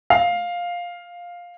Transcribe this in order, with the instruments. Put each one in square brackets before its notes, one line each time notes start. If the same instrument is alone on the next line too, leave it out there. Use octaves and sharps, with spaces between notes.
[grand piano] F5